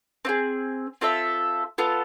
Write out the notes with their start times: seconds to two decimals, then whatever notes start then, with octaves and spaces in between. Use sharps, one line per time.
0.25 C4 F4 G#4
1.01 C4 F4 A4 E5
1.78 B3 F4 A4